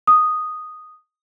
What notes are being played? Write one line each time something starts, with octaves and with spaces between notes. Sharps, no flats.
D#6